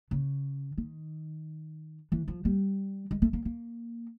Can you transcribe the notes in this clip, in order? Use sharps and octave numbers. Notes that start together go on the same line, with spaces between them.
C#3
D#3
E3
F3
G3
G#3
A3
A#3
A#3